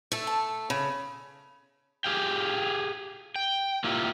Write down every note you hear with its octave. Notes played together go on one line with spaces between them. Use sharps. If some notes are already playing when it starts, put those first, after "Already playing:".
A3 A4
A5
C#3 B5
G4 G#4 F5 G5
G5
A#3 E4 F4 G4